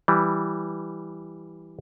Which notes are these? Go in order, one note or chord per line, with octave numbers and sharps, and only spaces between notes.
E3 G3